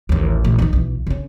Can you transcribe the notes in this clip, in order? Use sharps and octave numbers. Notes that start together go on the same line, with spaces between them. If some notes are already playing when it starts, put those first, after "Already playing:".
A1 D#2
A1 A#2
D3 D#3
B1 E3
D3 C#4